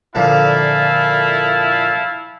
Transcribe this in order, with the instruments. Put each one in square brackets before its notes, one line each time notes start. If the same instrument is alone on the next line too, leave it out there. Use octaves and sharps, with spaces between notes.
[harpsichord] A#2 D3 F3 [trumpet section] E4 F5 A5